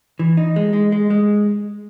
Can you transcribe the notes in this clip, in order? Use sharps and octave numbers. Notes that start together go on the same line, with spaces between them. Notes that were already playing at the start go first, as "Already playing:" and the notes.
E3
D#4
G#3
G#3
G#3
G#3